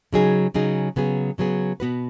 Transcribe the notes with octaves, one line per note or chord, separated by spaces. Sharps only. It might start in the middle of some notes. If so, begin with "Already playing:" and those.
C#3 F#3 D#4 G#4
C#3 F#3 D#4 G#4
C#3 F#3 B3 G#4
C#3 F#3 B3 G#4
B2 B3 F#4 B4